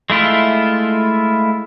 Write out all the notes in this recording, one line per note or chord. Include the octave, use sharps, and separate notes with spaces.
G#3 A3 E4 F4